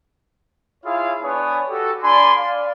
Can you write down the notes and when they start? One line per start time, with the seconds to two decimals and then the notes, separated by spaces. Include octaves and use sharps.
0.84 E4 F4 G#4 C#5 F5
1.22 B3 D4 B4 C#5 G#5 D#6
1.69 F#4 G4 A4
2.03 D4 D5 G#5 B5 C6
2.37 D5 F5